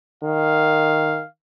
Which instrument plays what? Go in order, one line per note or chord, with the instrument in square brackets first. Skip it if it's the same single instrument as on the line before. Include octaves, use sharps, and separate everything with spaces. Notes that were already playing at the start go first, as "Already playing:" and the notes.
[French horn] D#3 [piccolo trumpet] F5